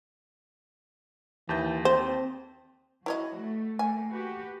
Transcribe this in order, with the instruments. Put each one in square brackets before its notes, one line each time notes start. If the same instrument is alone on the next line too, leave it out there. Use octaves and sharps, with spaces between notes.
[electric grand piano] D#2 A5 G6 [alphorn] E3
[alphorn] C4 [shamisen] C5
[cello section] F3 F#4 [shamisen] E4 C#5 D#5
[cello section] A3
[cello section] A3 A#3 [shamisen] G#5
[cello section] F#4 G4 B4